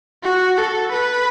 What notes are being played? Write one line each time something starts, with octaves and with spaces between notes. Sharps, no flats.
F#4
A4
B4